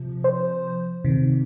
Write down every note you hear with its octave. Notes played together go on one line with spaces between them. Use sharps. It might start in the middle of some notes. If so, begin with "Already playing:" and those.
Already playing: C3 F3
C5
C3 D#3